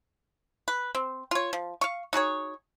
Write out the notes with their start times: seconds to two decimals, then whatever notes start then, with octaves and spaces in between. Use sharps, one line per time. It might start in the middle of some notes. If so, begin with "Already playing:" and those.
0.68 B4
0.95 C4
1.31 F4 C#5
1.53 F3
1.81 F5 C#6
2.13 D#4 F#4 G#4 C#5